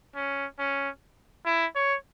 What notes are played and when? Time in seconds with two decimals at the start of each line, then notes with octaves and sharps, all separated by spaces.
0.15 C#4
0.59 C#4
1.46 E4
1.75 C#5